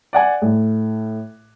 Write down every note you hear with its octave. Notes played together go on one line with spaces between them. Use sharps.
D5 F#5 G#5
A2